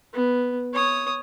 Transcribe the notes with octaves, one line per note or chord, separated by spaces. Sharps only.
B3
C#5 D#6